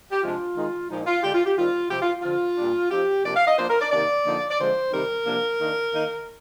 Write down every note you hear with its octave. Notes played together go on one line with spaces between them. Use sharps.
G4
C3 F3 G#3 D4 F4
D#3 G#3 D#4
A#2 F3 G#3 D#4
F4
D3 G#3 D4 G4
F4
G4
D#3 G3 C4 F4
C3 F3 C4 G4
F4
D3 F3 C4 F4
A#2 G3 D4
F3 C4 D#4 G4
C3 F3 A#3 D4 D5
F5
D#5
F3 A#3 D4 C5
A#4
D5
C3 D#3 A#3 D#4 D5
D3 F3 A#3 D#4
D5
D3 F3 G#3 C4 C5
C3 D#3 G3 C4 D#4 A#4
C3 F3 A#3 D4
D#3 A#3 D4
D#3 A#3 D#4